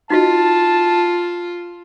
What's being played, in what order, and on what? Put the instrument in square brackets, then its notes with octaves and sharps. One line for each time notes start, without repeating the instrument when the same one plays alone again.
[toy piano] D#4 F#4 D#5 [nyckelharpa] F4 [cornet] A5